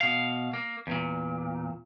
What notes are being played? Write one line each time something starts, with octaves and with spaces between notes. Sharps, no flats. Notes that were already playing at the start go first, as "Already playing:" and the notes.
B2 F5
A#3
E2 A#2